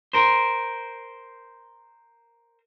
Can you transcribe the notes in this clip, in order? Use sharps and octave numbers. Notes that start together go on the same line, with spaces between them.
A#4 C5